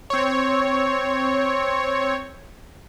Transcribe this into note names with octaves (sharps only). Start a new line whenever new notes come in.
C4 C#5